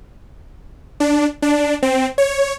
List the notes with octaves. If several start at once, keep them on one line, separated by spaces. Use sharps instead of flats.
D4
D4
C4
C#5